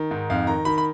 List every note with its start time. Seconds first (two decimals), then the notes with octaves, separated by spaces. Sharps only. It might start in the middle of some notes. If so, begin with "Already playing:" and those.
Already playing: D#3
0.11 G#2
0.30 F2 F5
0.47 D#3 A#5
0.65 D#3 B5
0.78 B5